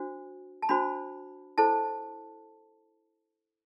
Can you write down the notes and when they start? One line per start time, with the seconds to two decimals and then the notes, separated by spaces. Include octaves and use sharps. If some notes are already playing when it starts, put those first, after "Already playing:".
Already playing: D4 F#4 C5
0.62 A5
0.69 D4 F#4 C5 B5
1.58 E4 A4 C5 A5